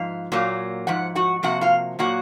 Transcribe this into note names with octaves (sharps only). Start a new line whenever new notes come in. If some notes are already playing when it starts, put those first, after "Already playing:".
Already playing: G#2 F3 F5
A#2 F#3 A#3
G#2 F3 F#5
F#4 F#5
C3 F3 A#3 F#4 F#5
F4 F5
A#2 F#3 A#3 F#4 F#5